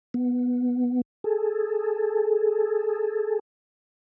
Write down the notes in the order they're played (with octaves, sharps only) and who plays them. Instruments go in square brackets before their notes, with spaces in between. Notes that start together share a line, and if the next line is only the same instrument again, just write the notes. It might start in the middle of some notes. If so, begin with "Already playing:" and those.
[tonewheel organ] B3
G#4 A4